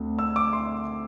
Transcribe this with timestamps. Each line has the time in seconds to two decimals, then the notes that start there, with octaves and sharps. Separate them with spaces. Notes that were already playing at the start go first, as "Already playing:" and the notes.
Already playing: D2 D3 C4
0.19 E6
0.36 D6
0.53 C6